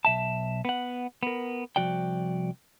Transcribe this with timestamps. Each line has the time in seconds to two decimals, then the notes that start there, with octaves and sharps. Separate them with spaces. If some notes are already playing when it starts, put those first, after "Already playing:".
0.05 B1 E5 A5
0.65 B3 F#5
1.23 B3 A#4
1.76 C2 G#2 F3 F#4 D5 G5